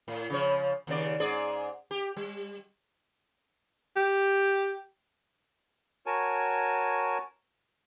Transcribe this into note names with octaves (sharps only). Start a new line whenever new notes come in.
A2
C#3 F3 C#5
D#2 C#3 D5
G#2 G#4 D5
G4
G3
G4
F#4 A#4 C#5 G#5 A5